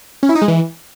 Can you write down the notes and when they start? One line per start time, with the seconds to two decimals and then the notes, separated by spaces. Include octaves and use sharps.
0.23 C#4
0.29 E4
0.35 D#4
0.42 G#3
0.48 E3